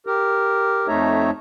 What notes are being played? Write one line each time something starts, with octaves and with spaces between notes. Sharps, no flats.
G4 A#4
F2 A3 D#4 C#5 E5 A#5